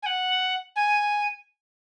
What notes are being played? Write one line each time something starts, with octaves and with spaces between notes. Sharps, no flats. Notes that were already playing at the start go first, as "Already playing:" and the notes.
G#5
F#5
G#5